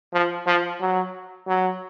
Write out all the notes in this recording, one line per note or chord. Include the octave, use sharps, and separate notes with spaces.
F3
F3
F#3
F#3